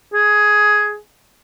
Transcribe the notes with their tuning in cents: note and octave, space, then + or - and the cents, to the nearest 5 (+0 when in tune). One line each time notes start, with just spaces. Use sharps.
G#4 +10